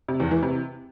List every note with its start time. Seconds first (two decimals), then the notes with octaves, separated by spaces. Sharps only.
0.08 C3
0.20 E2
0.31 E3
0.43 C3